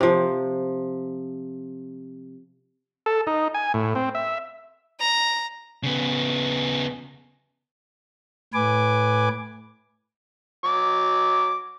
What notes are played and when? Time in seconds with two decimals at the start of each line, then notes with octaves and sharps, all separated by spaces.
0.01 C3 F3
3.06 A4
3.27 D#4
3.54 G#5
3.74 A2
3.95 C4
4.15 E5
5.00 A#5
5.83 C#3 B3
8.54 A2 B4 G#5 D6
10.64 F#3 D6